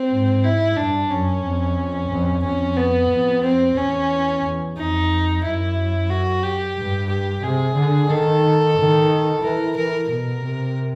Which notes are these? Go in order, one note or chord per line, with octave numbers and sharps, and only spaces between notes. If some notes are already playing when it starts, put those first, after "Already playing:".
Already playing: C4
G#2
E4
G2 D4
F#2 C#4
F2
F2
F2 C#4
B3
F2
C4
E2 C#4
E2
F2 D#4
F#2 E4
F#4
G4
G2
G4
C3 G#4
D3
D#3 A4
D#3
E3 A#4
E3 A#4
B2 A#4
C3